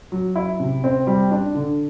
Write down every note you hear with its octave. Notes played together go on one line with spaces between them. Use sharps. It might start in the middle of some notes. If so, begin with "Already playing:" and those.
F#3
E4
C3
C4
G3
D4
D3